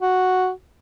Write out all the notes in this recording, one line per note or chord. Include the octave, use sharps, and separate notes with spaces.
F#4